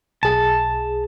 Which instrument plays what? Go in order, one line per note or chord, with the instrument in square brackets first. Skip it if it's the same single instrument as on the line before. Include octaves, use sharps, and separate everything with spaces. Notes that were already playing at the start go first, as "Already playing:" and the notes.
[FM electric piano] B1 G#4 [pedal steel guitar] A5